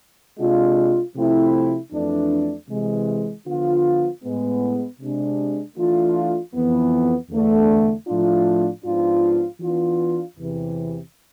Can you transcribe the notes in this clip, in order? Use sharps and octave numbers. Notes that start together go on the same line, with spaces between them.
C3 G#3 D4 F4
C3 F3 A3 C4 E4
F2 E3 A3 D4
C3 E3 G#3
D3 F3 B3 F4
A2 G#3 B3
C3 G#3 D4
E3 A3 D4 F4
F2 E3 B3
E2 D3 A3
A2 F3 A3 D4 F4
G#2 F3 B3 D4 F4
E3 B3 D4 F4
E2 C3 E3